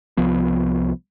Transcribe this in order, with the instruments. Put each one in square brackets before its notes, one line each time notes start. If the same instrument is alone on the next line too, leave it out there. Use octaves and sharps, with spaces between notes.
[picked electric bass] C2 F3 B3